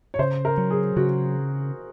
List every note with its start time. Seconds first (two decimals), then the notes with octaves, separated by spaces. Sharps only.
0.14 C#5
0.19 C#3 C5
0.45 A#4
0.58 F#3
0.71 G#4
0.96 C#3 F#4